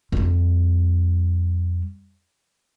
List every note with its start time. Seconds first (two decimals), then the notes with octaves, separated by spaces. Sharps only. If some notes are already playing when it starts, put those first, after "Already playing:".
0.12 F2 G3